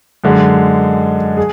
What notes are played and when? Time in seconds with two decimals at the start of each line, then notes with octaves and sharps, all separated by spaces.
0.24 F#2 D3 G#3
1.37 G#4